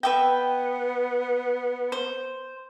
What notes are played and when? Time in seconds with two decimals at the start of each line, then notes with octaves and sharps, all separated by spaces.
0.03 B3 B4 E5 G5
1.92 C5